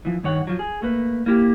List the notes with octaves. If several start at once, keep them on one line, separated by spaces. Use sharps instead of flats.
E3 F3
G2 D#3 C#5 F#5
F3 F#3
G#4
A3 A#3 B4
A#3 E4 G4